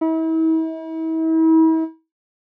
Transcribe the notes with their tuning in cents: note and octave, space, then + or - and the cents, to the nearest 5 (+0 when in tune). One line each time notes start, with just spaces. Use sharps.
E4 -40